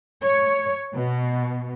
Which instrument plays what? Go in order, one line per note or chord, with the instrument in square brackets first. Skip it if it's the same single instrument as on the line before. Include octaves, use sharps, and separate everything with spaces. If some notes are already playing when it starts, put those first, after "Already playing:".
[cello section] C#5
B2